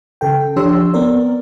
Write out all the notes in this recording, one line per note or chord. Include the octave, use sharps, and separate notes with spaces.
C#3 A4 G5
F3 D4 G4 C#5 C6 E6
B3 C4 A#4 D5